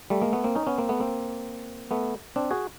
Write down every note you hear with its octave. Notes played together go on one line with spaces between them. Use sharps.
G3 A3
G#3 A#3
A3 B3
A#3 C4
C#4 D#4
B3 C#4
A#3 C4
A3 B3
A#3 C4
A3 B3
C4 D4
F#4 G#4